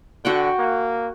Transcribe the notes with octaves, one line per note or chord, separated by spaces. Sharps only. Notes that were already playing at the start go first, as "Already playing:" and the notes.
D3 F#4 F#5 G5
A#3